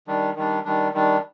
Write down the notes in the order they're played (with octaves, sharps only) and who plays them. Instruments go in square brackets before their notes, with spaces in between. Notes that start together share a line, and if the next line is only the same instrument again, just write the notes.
[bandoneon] D#3 G3 D4
D#3 G3 D4
D#3 G3 D4
D#3 G3 D4